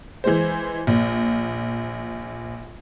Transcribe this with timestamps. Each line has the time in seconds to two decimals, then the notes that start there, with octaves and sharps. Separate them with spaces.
0.24 E3 G#3 C5
0.87 A#1